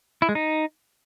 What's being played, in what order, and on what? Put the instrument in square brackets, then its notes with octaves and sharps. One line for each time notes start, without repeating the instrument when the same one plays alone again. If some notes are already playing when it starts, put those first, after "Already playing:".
[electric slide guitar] E4
G#3
D#4